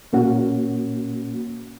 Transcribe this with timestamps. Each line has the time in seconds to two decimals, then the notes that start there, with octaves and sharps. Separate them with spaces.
0.13 A#2 A#3 C#4 F#4